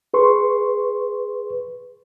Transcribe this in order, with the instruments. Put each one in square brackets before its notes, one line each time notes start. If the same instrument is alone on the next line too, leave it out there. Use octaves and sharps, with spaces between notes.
[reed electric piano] G#4 B4 C6 C#6